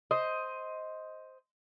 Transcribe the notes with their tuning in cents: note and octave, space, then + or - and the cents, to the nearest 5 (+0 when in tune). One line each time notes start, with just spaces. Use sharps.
C5 +0 D#5 +15